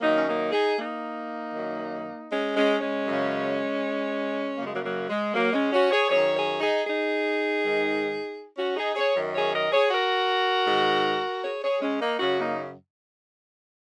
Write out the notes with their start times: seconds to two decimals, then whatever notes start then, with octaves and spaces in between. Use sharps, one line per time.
0.01 F#2 D#3 A#3 D#4
0.17 C#4
0.27 A#3 D#4
0.52 D#4 G#4
0.77 A#3 D#4
1.54 F#2 D#3
2.29 G#3 C#4
2.55 G#3 C#4
2.80 G#3 C#4
3.06 F#2 C#3
4.58 F#2 A#3
4.61 C#3 G#3
4.72 F#3 A#3
4.83 F#3 A#3
5.08 G#3
5.34 F#3 A#3
5.53 G#3 C#4
5.72 C#4 F#4
5.91 G#4 C#5
6.10 F#2 D#3 G#4 C#5
6.35 G#4 C#5
6.61 D#4 G#4
6.86 D#4 G#4
7.63 G#2 D#3
8.57 C#4 F#4
8.77 D#4 G#4
8.95 G#4 C#5
9.15 F#2 D#3
9.34 G#4 C#5
9.53 A#4 D#5
9.72 G#4 C#5
9.90 F#4 A#4
10.67 G#2 D#3
11.43 G#4 C#5
11.62 G#4 C#5
11.81 G#3 C#4
12.00 A#3 D#4
12.19 F#2 C#3 C#4 F#4
12.38 A#3 D#4